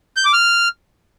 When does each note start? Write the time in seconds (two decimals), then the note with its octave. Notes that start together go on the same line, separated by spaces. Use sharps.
0.17 G6
0.25 D6
0.33 F6